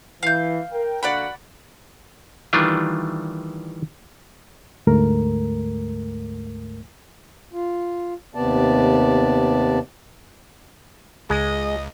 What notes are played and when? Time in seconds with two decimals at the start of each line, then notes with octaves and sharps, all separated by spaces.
0.23 E3 F5 G6
0.71 A#4 G5
1.03 D3 A#3 F#4 D5 F#5 B5
2.53 D#3 E3 G3 A3 D4 F4
4.87 D2 G#2 A3 A#4
7.53 F4
8.35 D#2 C3 B3 D5 A5
11.30 C#2 G#3 D#5